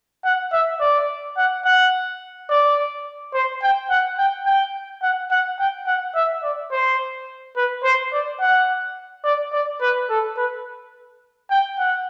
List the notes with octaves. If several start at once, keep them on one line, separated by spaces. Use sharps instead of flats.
F#5
E5
D5
F#5
F#5
D5
C5
G5
F#5
G5
G5
F#5
F#5
G5
F#5
E5
D5
C5
B4
C5
D5
F#5
D5
D5
B4
A4
B4
G5
F#5